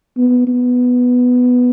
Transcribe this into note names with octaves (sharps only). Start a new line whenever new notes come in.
B3
B3